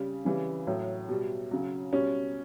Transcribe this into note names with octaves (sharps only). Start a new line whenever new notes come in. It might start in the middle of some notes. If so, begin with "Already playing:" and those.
Already playing: C#3 G3
C#3 E3 G3
A2 F#3
B2 G3
C#3 F#3
B2 G3 C#4